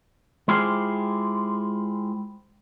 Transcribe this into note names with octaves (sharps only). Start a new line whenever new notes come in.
G#3 E4 F4 G4 G#4 C5